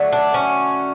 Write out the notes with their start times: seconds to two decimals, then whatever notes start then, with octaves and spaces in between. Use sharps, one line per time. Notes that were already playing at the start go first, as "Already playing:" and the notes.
Already playing: D3 F#3 A3
0.13 D4
0.34 C#4